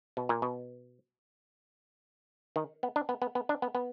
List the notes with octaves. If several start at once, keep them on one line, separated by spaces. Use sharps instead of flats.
B2
A#2
B2
D#3
B3
D4
B3
B3
B3
D4
B3
B3